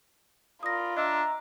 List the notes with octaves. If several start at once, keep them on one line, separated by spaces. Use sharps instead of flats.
F4 A#4 D5 B5 D#6 A#6
D4 D#5 E5 A#5 E6